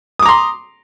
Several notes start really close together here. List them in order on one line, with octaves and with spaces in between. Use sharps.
D#6 D6 A#5 C6